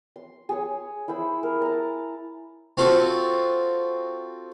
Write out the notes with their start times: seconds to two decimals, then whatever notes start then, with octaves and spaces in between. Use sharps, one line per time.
0.16 C6
0.49 G#4 C#5
1.08 E4 G#4 C5 B5
1.43 A#4
1.62 A5 A#5
2.77 C4 F4 F#4 A4